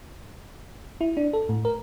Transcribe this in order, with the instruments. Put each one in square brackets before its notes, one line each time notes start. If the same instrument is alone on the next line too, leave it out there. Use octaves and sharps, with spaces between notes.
[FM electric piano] E4
D4
A4
A2
A#4